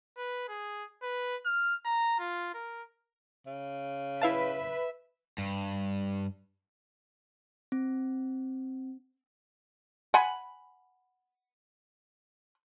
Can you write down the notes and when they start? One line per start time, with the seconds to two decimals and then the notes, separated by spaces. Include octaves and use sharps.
0.18 B4
0.49 G#4
1.03 B4
1.46 F6
1.85 A#5
2.19 F4
2.55 A#4
3.46 C#3
4.21 E4 B4 E5 F5 A5
5.38 G2
7.72 C4
10.14 F#5 G#5 B5